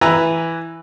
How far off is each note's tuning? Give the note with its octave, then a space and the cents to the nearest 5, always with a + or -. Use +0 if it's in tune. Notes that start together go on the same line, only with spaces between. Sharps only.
E3 +0 B4 +0 A#5 +0